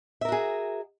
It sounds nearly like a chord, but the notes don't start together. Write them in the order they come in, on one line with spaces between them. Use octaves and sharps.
E5 A#4 F#4 G#4